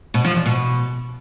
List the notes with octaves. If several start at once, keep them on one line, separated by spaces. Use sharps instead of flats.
B2
F3
E2
B2